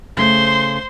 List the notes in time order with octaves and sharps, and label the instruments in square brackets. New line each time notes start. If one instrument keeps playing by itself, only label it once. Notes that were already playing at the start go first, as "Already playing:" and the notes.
[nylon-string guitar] C#3 A3 [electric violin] C5 C6